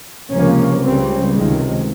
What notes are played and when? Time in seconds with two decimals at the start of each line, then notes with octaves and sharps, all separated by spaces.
0.32 C#2 C3 F3 A#3 C#4
0.82 C#2 C#3 G3 C4
1.33 C#2 C3 D#3 G#3